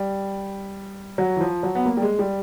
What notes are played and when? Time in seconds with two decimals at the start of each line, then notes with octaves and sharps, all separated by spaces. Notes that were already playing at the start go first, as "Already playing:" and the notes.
Already playing: G3
1.18 F#3
1.36 E3
1.41 F3
1.63 F#3
1.75 B3
1.86 A#3
1.97 G3
2.02 G#3
2.19 G3